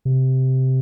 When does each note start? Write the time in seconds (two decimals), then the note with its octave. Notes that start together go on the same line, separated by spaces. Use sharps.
0.05 C3